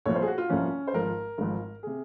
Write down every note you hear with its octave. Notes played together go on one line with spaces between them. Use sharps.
C2 A#2 F3 C#5
C5
G#4
F#4
F4
C2 A#2 F3 C#4
C5
G#1 G#2 F3 A#4
G#1 G#2 F3
C3 G#4